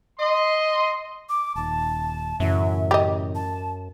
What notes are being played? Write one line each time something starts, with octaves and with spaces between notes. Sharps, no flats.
D#5 C6
D6
D#1 D#2 A5
F#2 A2 C#3 E3 E5
G4 D#5
A5